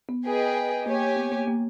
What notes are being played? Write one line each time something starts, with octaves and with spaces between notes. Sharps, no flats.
B3
G#4 B4 D#5 G5
A#3 G4 C#5 G#5
B3
A#3
A#3